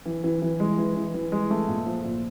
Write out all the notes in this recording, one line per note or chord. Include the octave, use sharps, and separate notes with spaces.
E3
E3
E3
G#3
E3
E3
E3
G#3
A3
A#2
F3
A#2